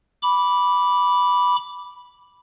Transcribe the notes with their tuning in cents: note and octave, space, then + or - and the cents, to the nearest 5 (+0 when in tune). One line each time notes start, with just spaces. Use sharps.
B5 -5 D6 -10